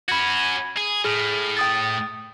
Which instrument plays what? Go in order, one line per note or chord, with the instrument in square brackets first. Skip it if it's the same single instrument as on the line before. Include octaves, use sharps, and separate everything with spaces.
[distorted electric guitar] C#4 F#4 [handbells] B5 G#6
[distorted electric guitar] G#4
[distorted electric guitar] A2 [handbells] G#4 F6
[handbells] G5 D#6 A6